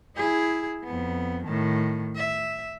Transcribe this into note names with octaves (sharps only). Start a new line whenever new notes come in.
E4 G#4
F2 B3
A2 D#3
E5